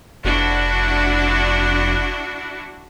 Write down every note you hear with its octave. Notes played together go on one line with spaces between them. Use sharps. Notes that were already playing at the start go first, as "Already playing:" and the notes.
F1 D4 E4 F#4